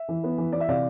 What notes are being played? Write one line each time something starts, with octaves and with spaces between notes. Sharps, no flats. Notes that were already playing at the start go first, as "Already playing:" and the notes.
Already playing: E5
E3
B3
E3
E3 D5
E5
C3 D5 F5